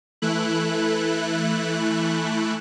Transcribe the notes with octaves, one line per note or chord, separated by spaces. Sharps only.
E3 A3 E4 F#6